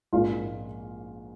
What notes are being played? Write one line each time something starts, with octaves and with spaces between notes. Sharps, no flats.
A#1 G#2 F3 A#3 F4 F5